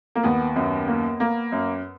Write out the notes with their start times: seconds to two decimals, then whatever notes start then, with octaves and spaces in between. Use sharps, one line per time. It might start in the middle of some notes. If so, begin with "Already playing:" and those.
0.15 A#3
0.23 D#2 B3
0.56 F#2 B3
0.88 A#3
1.20 A#3
1.52 F#2